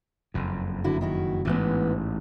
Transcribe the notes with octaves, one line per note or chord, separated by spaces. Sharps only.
F#1 F2
D3 E4 F#4
D#3 E4 F#4
A1 G#2 E3 G#3 B3